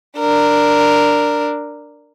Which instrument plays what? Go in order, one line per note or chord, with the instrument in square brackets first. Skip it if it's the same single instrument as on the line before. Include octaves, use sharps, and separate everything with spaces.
[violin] D4 A#4